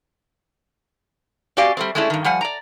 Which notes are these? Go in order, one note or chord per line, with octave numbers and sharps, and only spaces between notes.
C4 F#4 G4 D5 F5 G#5
G3 A3 C4
G#3 A3 C#4 D4 E4
G2 D#3
F3 G3 F#5 G#5
D5 A#5